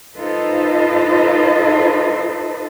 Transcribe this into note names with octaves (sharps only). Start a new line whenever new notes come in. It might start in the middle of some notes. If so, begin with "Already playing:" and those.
D#4 F4 A4 B4 C5 D#5